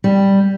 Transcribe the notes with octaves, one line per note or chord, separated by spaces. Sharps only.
G3